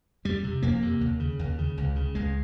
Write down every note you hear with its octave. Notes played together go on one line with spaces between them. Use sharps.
F2 G3
C3
F2 A#3
C3
D#2
C#3
D#2
C#3
C#2
C#3
C#2 G#3